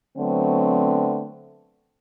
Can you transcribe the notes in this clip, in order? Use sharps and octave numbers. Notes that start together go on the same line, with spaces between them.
D3 F#3 A3 B3 C4